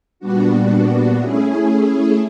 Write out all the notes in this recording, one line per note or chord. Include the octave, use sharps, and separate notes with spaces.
A#2 G3 B3 D4 F#4
A3 C#4 E4 G#4